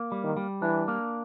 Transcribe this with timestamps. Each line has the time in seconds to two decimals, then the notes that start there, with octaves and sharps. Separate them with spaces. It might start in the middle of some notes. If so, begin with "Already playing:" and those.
Already playing: A#3
0.12 G3
0.24 D#3
0.37 G3
0.62 E3 D4
0.88 A#3